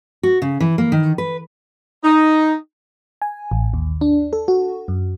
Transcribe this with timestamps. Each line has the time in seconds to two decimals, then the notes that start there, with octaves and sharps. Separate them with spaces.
0.23 F#4
0.42 C#3
0.60 E3
0.78 A#3
0.92 D#3
1.18 B4
2.04 D#4
3.22 G#5
3.51 A1
3.74 D#2
4.01 D4
4.33 A4
4.48 F#4
4.88 F#2